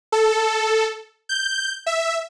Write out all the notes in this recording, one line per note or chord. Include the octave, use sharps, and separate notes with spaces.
A4
G6
E5